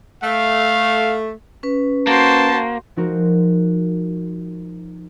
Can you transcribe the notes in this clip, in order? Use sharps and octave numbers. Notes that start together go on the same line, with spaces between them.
A3 F5
C#4 B4
A#3 F#4 C5 A5
F3 G#3 D#4 F#4 A#4 C5